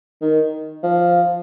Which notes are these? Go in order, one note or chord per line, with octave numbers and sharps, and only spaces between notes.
D#3
F3